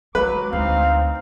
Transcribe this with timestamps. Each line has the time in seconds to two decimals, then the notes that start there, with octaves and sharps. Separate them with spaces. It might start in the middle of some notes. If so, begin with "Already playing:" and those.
0.15 F#3 G#3 B4 D6
0.53 D2 C4 D#4 F5